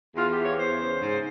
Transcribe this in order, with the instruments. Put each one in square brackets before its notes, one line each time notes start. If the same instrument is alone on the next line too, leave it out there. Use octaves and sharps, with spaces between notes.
[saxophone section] E2 F4
G4
E3
C#5
E2 C5
C#3
G#2